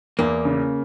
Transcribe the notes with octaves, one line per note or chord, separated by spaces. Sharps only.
E2 A#3
C#3